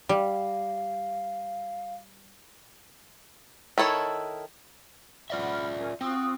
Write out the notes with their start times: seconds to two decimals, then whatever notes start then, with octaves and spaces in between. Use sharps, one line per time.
0.09 G3 F5
3.78 D#3 E4 A4 C#5
5.30 F4 D5 E5 F#5 B5 F6
5.77 C#4 A#4 G#5
6.01 C4 F4 F#4 D#6